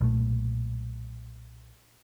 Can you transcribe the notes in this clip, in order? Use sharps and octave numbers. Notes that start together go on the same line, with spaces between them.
B1 A#2 A3